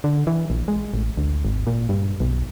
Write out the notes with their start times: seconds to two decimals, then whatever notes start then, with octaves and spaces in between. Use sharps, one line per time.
0.04 D3
0.27 E3
0.50 A#1
0.68 G#3
0.94 A1
1.17 D2
1.45 G#1
1.67 A#2
1.89 G2
2.20 B1